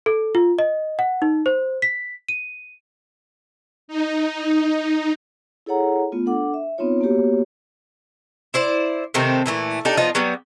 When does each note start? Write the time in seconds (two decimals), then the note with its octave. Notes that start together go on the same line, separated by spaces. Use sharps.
0.06 A4
0.35 F4
0.59 D#5
0.99 F#5
1.22 D#4
1.46 C5
1.82 B6
2.29 D#7
3.88 D#4
5.66 E4 G#4 A4 C#5 F#5 A#5
6.12 A3 B3 F4
6.26 D4 A4 F#5 D6
6.54 E5
6.78 B3 C4 D#4 F4 C#5
7.01 A#3 B3 F#4 G4 C#5
8.54 E4 C5 D5
9.14 C3 D#3 A3 C4
9.46 A#2 E3 A3
9.85 D4 D#4 G4 A4
9.97 F3 B3 D#4 F4
10.15 F#3 G3 B3